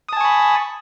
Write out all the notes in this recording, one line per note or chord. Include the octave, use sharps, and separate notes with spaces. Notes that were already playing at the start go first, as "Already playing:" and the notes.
G#5 A5 B5 C#6 D#6